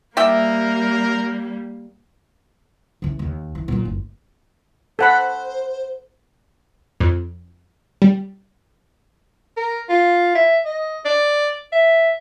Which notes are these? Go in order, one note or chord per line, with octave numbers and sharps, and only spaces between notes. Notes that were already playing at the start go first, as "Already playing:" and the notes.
G3 A#3 A#4 D5 E5 G5
C#3 E3
D#2
E3
A#2 F#3
F#1
A4 C5 F#5 B5
F2
G3
A#4
F4
E5
D#5
D5
E5